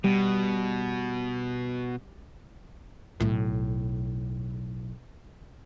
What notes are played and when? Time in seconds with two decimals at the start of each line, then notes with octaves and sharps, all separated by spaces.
0.04 B2 G3
3.20 B1 A2